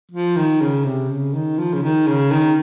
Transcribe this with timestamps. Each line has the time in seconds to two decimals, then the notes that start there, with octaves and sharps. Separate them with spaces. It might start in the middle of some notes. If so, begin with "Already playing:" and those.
0.11 F3
0.36 D#3
0.61 C#3
0.85 C3
1.10 C#3
1.34 D#3
1.58 F3
1.73 C#3
1.83 D#3
2.07 C#3
2.31 D#3